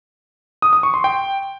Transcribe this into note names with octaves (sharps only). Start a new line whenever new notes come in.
D#6
D#6
C#6
C6
G5